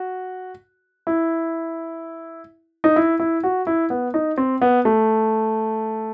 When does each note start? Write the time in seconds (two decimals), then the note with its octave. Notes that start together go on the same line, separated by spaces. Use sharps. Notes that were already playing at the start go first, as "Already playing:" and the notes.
Already playing: F#4
1.07 E4
2.84 D#4
2.96 E4
3.20 E4
3.43 F#4
3.67 E4
3.90 B3
4.14 D#4
4.38 C4
4.62 B3
4.85 A3